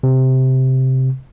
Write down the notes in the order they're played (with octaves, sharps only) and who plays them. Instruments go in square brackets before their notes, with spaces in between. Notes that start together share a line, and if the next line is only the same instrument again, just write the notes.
[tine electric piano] C3